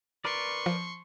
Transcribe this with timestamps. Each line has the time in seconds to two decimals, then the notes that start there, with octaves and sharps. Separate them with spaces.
0.25 A#4 B4 D5 C6 C#6
0.66 F3